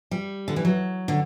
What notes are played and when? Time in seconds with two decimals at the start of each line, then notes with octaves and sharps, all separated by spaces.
0.11 G3
0.48 D3
0.56 E3
0.65 F#3
1.08 D3